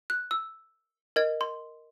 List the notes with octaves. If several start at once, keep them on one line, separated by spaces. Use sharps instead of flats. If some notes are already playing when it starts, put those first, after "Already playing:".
F#6
E6
A#4 D#5 G#6
C6